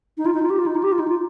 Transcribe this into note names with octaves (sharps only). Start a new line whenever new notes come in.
D#4
F4
D#4
F4
G4
F4
D#4
F4
G4
F4
D#4
F4